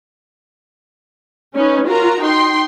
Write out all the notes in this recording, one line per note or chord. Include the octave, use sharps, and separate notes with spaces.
C#4 D#4 B4
F4 F#4 A#4 A#5
D#4 G5 C6